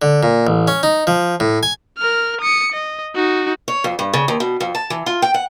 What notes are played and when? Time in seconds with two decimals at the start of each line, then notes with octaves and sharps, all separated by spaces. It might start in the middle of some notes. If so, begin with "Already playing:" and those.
0.02 D3
0.23 A#2
0.47 A1
0.68 C#4
0.83 D#4
1.07 F3
1.40 A2
1.63 G#5
1.98 A#4 F6
2.41 D#6 C#7
2.72 D#5
3.15 D#4 F#4
3.68 C#5
3.84 F2
3.99 G2
4.13 C#3
4.28 D#2
4.40 B2
4.60 F2
4.75 A5
4.90 E3
5.06 F4
5.22 G5
5.34 F#5